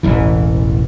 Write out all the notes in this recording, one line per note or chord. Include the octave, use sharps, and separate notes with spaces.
E1 A1 E3